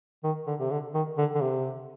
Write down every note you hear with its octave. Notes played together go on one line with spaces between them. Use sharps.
D#3
D3
C3
D3
D#3
D3
D3
C3